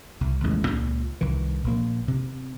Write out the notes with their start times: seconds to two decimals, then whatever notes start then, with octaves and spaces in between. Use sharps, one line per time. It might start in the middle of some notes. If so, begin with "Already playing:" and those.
0.21 C2
0.44 A1 D#2 C#3 G#3
0.67 C#2 A#2
1.21 C2 D#3 E3
1.64 A#1 A#3
2.08 C3